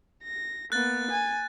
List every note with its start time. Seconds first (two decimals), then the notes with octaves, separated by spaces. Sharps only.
0.24 A#6
0.72 A#3 B3 F#6 A6
1.11 G#5